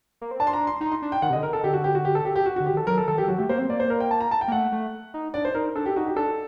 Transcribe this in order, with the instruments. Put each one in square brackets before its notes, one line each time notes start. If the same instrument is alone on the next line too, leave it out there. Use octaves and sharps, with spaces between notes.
[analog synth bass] A#3
C4
[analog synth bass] D4 [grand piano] A5
[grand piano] C6
A#5
C6
[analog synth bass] D#4 [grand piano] A#5
[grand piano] C6
[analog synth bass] D4
[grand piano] G5
[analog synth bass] D#3 [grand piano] F#5
[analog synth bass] C3
[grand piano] D#5
[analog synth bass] D3
[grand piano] A#4
A4
[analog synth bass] D3 [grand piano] G4
[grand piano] F#4
G4
F#4
G4
A4
G4
G4
F#4
F#4
[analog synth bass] D3
[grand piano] G4
[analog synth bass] D#3 [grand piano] A4
[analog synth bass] F#3 [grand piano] A#4
[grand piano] A4
[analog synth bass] D#3 [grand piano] A4
[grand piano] G4
[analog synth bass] F#3 [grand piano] F#4
[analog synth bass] A3 [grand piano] G4
[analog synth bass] A#3 [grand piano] C5
[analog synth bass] C4
[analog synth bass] A#3 [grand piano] D5
[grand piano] C5
A#4
G5
A5
A#5
A5
G5
[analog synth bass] A#3
[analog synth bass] A3 [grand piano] F#5
[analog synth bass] A3
D#4
[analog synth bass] D4 [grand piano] D5
[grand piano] C5
[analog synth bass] D#4 [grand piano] A#4
[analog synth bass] D4 [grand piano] A4
[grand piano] G4
[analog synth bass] D#4 [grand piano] F#4
[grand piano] G4
[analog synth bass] D4 [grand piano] A4